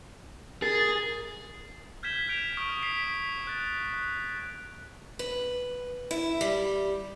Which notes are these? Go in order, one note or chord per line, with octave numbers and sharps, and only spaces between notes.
G#4 A#4 A6
F6 G6 G#6 B6 E7 G7
G6 D7 F7
C#6 D#6 F6 D7
B6 C7 F7
F#6 A6
B4
E4
G3